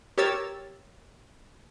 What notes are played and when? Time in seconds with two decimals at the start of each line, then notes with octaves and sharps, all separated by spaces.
0.18 G4 A#4 C#5 E6 A6